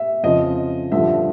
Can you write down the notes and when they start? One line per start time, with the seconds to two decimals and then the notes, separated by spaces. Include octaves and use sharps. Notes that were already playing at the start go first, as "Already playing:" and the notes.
Already playing: E5
0.23 F2 C#3 F3 D#5
0.92 G2 D3 F3 E5